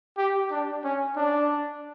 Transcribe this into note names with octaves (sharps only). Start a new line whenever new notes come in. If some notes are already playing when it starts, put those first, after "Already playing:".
G4
D4
C#4
D4